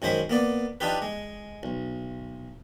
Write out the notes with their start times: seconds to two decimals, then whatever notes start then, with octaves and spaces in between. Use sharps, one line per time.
0.02 F#2 D#3 G#3 C5 B5
0.30 A#3 B3 D5
0.80 D4 D#4 F4 G4 B4
1.02 G#3
1.63 B1